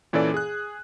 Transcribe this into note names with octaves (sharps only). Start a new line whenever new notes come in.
A#2 E3 C#4 A4 D5
G#4 F#6